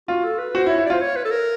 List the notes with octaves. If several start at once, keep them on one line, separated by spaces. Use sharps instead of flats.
F4 F#4
A4
B4
F#4 C5
E4
C#5
E4
F4 D5
C5
C#5
B4
A4
A#4